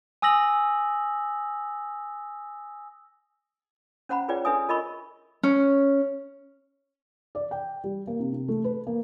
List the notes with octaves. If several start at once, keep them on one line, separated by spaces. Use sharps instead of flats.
G#5 D#6 E6 A#6 F#7
C#4 C5 F#5 A#5 B5
F4 G#4 B4 C#5 D5 G5
D4 A4 B4 E5 G#5 D#6
F4 A#4 D#5 E5 B5 C#6
C#4
D5
G5
G3
A#3
C3
C3
A3
B4
A#3